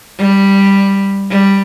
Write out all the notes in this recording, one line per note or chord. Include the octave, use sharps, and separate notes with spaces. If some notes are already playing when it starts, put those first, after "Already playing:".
G3
G3